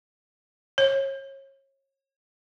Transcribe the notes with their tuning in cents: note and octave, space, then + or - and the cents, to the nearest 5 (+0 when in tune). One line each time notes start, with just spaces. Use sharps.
C#5 -30